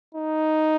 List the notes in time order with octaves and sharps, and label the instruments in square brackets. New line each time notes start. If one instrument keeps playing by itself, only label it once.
[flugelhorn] D#4